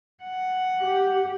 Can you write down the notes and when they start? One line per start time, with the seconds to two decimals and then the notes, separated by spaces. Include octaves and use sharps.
0.24 F#5
0.81 G4